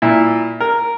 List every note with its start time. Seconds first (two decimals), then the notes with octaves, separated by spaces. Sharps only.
0.02 A#2 E4
0.60 A#4